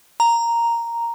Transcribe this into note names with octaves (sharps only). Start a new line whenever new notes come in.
A#5